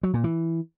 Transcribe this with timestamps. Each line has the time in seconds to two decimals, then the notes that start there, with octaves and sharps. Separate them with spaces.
0.03 F#3
0.14 A#2
0.24 E3